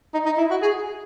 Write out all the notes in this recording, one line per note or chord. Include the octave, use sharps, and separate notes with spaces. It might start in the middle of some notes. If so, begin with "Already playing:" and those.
D#4
D#4
E4
F#4
G#4